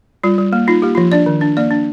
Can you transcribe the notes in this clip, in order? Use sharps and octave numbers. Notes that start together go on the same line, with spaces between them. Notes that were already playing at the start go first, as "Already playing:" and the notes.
G3 F4
G3
A#3
D#4 F4
A#3 G4
F3 F4
D4 D5
D#3
D4
A#3 D5
D4